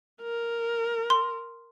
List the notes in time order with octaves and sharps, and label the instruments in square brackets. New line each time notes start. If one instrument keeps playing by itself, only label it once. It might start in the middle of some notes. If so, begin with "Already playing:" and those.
[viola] A#4
[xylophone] C6